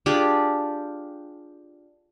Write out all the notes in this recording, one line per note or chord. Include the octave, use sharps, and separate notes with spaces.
D4 F4 G4 G#4